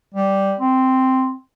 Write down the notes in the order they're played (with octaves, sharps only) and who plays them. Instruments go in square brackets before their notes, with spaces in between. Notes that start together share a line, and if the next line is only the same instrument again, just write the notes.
[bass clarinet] G3
C4